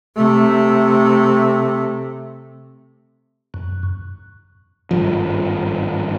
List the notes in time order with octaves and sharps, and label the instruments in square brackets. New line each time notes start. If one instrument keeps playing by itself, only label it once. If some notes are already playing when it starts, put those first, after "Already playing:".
[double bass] C3 A3
[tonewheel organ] F#2
[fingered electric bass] G#1 G2 F3